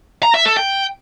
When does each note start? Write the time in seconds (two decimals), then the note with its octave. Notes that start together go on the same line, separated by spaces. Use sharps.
0.23 A#5
0.34 E5
0.46 A4
0.57 G5